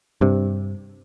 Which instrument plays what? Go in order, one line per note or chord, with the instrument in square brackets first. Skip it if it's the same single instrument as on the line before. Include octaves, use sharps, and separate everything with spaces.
[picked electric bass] G2 C3